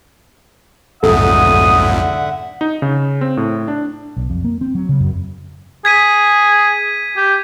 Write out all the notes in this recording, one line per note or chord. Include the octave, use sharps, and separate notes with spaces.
B1 F2 G#2 D3 A4 E5 F#5 D#6
D#4
C#3
C4
A2
D4
B1
F2
A#3
C4
F#3
C#3
F#2
G#4 G#6 B6 D#7
G4